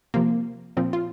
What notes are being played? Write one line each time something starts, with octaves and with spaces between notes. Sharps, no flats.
C3 F3 A#3
A#2 F3 C4
F4